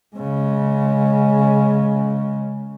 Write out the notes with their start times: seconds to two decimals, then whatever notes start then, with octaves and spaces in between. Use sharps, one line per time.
0.16 C#3 G#3